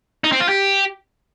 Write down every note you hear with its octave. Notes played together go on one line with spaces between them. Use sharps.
D#4
C4
F4
G4